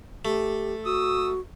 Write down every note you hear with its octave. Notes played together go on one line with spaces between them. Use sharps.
A3 G4
F#4 D#6 E6